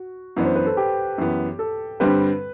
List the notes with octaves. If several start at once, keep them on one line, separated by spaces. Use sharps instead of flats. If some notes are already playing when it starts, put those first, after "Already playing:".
Already playing: F#4
F#2 E3 B3 D4
C5
B4
A4
G4
F#2 E3 B3
A4
G2 D3 G3 C4 G4 B4